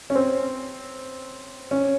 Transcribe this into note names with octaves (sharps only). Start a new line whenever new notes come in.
C#4
C4
C#4